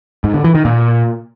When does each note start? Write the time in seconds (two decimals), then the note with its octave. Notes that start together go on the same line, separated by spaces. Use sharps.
0.24 G#2
0.34 D3
0.44 E3
0.55 D#3
0.65 A#2